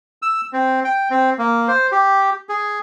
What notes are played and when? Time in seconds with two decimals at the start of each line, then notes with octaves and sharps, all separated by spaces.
0.22 E6
0.53 C4
0.85 G5
1.11 C4
1.39 A#3
1.68 C5
1.92 G4
2.49 G#4